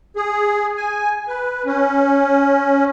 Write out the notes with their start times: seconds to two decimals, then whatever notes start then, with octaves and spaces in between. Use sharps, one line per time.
0.16 G#4
0.77 G#5
1.28 B4
1.66 C#4